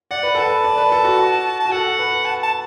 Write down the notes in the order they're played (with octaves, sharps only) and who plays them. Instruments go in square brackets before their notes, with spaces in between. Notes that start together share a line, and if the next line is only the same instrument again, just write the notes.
[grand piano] D5 [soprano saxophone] F#5
[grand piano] B4
[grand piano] A4 [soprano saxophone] A5
[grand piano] B4
D5
B4
A4
F#4
F#4
[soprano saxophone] A5
[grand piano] F#4
[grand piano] A4 [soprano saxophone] F#5
[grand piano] B4
[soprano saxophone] A5
A5